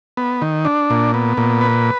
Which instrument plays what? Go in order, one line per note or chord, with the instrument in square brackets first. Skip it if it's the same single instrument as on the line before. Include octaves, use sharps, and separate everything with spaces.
[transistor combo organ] B3
D#3
D4
A#2
B3
A#2
B4